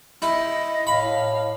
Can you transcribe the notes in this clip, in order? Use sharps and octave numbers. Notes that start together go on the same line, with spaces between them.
E4 D#5
A2 F5 B5